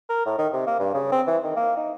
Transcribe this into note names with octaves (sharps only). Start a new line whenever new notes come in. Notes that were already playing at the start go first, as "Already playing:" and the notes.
A#4
A2
D#3
C3
A#3
G2
C#3
C4
E3
D#3
A#3
D#4